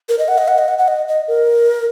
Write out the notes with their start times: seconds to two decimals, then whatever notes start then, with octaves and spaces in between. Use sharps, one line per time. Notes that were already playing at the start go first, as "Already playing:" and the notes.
0.09 A#4
0.19 D#5
0.28 F#5
0.38 D#5
0.48 F#5
0.58 D#5
0.68 F#5
0.78 F#5
0.88 D#5
1.08 D#5
1.28 A#4